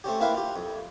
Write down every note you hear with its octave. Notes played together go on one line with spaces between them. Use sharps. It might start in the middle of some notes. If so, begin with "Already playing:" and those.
A3 C4 C#4 G4
A#3 C4 E4 B4 E5 F5
F4 G4
F2